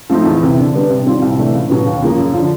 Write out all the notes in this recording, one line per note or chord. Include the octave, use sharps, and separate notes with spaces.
F3 A3 C4 D#4
E2
C3 E3
D3
G3 B3 D4
C3
D#3 G3 C4 F4
C2
C3 E3 A3 D4
C#2
B2 F#3 B3
D#2
C#3 F3 A#3
F#2
D3 F3